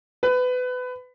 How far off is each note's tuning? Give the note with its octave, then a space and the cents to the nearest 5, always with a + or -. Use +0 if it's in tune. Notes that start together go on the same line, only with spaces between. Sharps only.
B4 +25